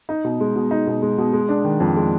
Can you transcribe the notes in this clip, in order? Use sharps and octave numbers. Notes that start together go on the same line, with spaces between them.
D#4
B2
G#3
B2
D#4
B2
G#3
B2
G#3
D4
D#3
F2
G#3